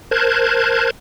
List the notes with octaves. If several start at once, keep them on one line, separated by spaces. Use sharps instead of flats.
A#4 C5 A5 F#6 G#6